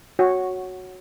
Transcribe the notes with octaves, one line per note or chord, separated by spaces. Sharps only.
F#4 C#5